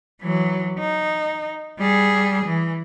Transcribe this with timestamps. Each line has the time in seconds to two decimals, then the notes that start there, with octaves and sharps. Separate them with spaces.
0.21 E3 F#3
0.79 D#4
1.79 G3 G#4
2.45 E3